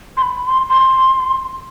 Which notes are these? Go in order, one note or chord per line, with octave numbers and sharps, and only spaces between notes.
C6
B5
C6
C6